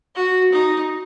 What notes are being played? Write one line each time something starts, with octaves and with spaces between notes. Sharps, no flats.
F#4
D#4